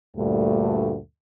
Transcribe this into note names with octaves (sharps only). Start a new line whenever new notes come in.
D2 G2 A#2 A3